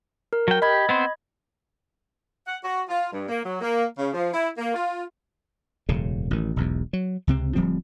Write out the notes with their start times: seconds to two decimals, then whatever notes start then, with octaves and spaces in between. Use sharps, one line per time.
0.33 A#4
0.48 F#3 G5
0.62 G4 D#5 B5 G#6
0.89 B3 C4 C5
2.47 F#5
2.63 F#4
2.87 F4
3.13 G2
3.28 A#3
3.44 F#3
3.60 A#3
3.98 C#3
4.14 F3
4.34 E4
4.58 A#3
4.75 F4
5.89 E1 F#2 A2 C#3
6.31 A1 D#3
6.56 E1 B1 E2
6.93 F#3
7.27 C#2 C3 C4
7.55 D1 F3 G3 C4